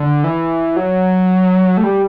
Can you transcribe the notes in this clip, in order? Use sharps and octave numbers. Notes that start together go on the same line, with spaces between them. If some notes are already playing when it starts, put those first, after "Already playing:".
Already playing: D3
E3
F#3
A3
G3